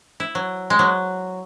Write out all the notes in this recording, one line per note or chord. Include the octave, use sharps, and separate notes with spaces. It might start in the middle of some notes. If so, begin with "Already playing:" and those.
E4
F#3
G#3
F#3